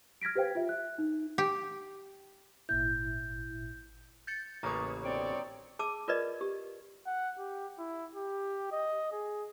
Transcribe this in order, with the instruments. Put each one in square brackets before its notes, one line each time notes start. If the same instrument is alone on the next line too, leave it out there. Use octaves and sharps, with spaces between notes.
[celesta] F6 G#6 A#6 B6 D7
G4 B4 C5 F5 G5
F4 E5
E5 F#6
D#4
[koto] G4
[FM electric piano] G#1 A#2 E4 [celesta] G6
[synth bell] G6 A6 C#7
[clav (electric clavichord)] A1 C#3 A#3 [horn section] B4 C#5 [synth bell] A#5 D#6
[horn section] B2 D3 C4 [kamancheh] C#5 D5
[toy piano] G#4 A5 D6 E6
F4 A#4 B4 D5 D#5
G4
[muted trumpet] F#5
G4
E4
G4
D#5
G#4